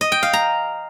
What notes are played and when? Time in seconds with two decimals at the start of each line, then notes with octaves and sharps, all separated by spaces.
0.01 D#5
0.12 G5
0.23 F5
0.33 A#5